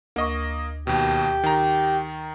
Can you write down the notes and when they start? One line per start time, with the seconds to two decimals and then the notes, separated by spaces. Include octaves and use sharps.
0.16 D2 A#3 D#5 C#6
0.87 D#2 B2 G4
1.44 D#3 A#5